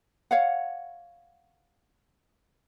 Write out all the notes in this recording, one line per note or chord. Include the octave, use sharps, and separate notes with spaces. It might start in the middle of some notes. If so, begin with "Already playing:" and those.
C#5 F5 F#5